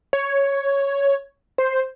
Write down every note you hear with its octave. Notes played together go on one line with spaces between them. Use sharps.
C#5
C5